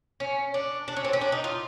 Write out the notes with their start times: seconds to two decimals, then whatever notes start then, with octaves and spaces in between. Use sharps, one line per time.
0.20 C#4
0.54 D4
0.88 D4
0.96 C#4
1.04 C4
1.13 C#4
1.21 D4
1.32 D#4
1.44 F4